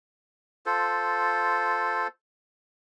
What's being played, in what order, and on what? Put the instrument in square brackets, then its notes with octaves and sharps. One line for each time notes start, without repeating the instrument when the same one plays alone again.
[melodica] F4 A4 C5